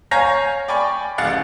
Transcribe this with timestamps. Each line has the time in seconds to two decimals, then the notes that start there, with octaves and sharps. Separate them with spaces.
0.11 C#5 F5 G#5 A#5 G6 A#6
0.68 D5 G5 G#5 B5 C#6
1.18 D1 A1 F5 F#5 A6